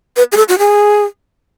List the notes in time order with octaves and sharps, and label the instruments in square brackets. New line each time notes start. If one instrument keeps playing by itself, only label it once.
[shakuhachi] B4
G#4
A4
F#4
G#4